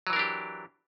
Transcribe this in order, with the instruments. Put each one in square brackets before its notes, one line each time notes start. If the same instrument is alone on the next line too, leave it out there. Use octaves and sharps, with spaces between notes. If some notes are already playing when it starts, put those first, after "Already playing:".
[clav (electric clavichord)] F#3
E3
A#4
D4
G4